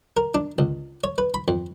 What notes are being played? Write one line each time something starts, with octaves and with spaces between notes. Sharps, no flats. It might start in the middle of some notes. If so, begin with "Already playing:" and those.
A#4
D4
C#2
C#5
B4
B5
F2